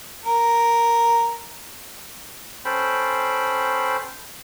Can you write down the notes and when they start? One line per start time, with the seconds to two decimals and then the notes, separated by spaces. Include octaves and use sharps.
0.24 A#4
2.65 C#4 A4 C5 G5 B5